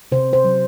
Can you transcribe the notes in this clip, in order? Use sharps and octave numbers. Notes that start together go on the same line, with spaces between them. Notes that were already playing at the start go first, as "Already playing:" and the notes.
C3 C5
C5
F#3